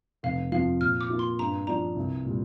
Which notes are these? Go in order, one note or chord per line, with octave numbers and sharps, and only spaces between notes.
F1 F5
F2 F3 F5
A#2 F6
D6
A#3 F4
C6
G2 A#5
F3 D4 A#5
C2
A#2 G3